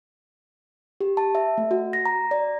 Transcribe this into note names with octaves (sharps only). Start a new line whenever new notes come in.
G4
A5
E5
A3
F#4
A#6
A#5
D5